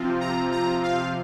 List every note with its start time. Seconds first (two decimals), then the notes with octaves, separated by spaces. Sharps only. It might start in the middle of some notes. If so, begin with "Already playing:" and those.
Already playing: C3 F3 C4 F4
0.21 A#5
0.52 A#5
0.83 F5